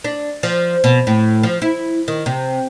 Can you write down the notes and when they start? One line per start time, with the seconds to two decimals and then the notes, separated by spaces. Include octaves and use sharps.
0.04 D4
0.43 F3
0.84 B2
1.07 A2
1.43 F3
1.62 E4
2.08 D#3
2.26 C3